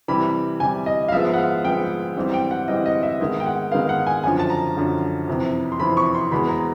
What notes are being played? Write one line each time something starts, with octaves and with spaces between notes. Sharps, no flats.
C3 E3 G3 B5
C3 E3 G3 G#5
D#5
F5
G#2 F3 G#3 B3 E5
F#5
F5
G#2 F3 G#3 B3 G5
G#2 E3 G3 C4
G5
F#5
G#2 E3 G3 C4 D#5
D#5
E5
G#2 D#3 G#3 B3
G5
F#5
G#2 D#3 G#3 B3 F5
F#5
G#5
F#2 D3 F3 G#5
A5
A#5
F#2 D3 F3
F2 C3 E3
C6
F2 C3 E3 B5
C#6
C6
E2 B2 G#3 B3 B5
A#5